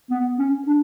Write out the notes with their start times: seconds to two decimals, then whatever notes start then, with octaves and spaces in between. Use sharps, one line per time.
0.10 B3
0.39 C#4
0.67 D4